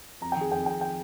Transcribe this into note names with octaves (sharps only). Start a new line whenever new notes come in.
F2 A#5
G5
D#3 G#4
F2 G5
F2 G5
G5